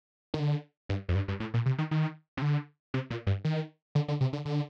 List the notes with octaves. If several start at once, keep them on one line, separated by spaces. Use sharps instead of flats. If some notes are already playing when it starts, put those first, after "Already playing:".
D#3
D3
G2
F2
G2
G2
A2
A#2
C3
D#3
D#3
C3
D3
C3
A#2
G2
D#3
D3
D3
C3
D3
D3